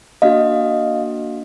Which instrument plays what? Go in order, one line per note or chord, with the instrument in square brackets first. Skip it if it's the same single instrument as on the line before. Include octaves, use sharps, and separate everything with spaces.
[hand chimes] A#3 D4 F#4 D#5 F5